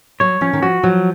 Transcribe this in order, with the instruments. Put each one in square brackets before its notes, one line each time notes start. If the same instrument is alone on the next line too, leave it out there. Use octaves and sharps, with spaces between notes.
[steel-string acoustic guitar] F#3 [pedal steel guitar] C#5
[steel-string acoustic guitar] F3 [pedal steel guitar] C#4
[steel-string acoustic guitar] D#3
[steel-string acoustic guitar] F3 [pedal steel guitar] F#4
[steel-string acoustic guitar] F3 [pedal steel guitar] F#3